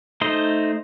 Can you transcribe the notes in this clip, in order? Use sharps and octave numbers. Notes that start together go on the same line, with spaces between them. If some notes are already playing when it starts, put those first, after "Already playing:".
A3 D#4 C5 D#5